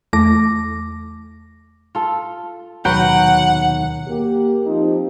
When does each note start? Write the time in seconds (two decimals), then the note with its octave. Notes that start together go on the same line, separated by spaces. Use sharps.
0.13 E2 A3 D6 A#6
1.95 F4 A4
2.85 D#2 B2 D#3 F#3 B4 F#5 G5
4.08 A#3 G4
4.66 F3 C4 D#4 F4 G4